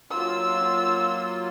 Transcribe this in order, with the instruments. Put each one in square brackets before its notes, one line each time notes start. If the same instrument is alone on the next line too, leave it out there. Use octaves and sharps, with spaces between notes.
[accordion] F#3 A#3 F4 [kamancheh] E6